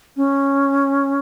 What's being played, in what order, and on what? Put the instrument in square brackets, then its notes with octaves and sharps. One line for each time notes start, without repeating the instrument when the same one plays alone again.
[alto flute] C#4